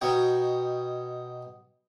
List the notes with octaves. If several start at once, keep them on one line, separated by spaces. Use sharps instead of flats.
B2 D#4 C#5 G5